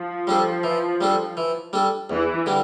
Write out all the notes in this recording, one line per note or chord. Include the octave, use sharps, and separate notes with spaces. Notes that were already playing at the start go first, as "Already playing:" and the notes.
Already playing: F3
G3 D4 A4
E3
G3 D4 A4
E3
G3 D4 A4
E2 E3
D3 G3 D4